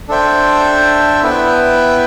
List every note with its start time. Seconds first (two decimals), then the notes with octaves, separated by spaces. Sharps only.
0.08 D4 A4 C5 E5 G5
1.23 B3 E4 B4 E5 G5